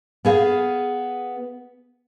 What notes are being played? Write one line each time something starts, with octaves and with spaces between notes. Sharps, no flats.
B3 G#4 F5